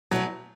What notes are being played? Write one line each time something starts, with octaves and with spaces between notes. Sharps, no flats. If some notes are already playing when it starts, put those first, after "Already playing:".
B2 F#3 A3 C#4 E4